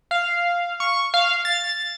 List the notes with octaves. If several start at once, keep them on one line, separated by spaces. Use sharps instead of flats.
F5
C#6
F5
A6